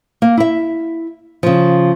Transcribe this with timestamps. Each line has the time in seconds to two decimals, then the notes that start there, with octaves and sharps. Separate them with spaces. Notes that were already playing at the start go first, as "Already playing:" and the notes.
0.22 A#3
0.37 E4 E5
1.43 C#3 F3